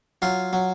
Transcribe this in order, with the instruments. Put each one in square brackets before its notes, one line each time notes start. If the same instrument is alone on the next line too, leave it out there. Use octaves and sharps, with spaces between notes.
[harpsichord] F#3 F4
F#3